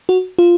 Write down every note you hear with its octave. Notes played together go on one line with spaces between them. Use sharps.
F#4
F4